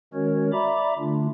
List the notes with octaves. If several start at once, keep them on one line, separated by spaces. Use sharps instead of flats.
D#3 G#3 C#4 F#4 A#4 C#5
D5 E5 A#5 B5 D6
D3 A3 D4 F4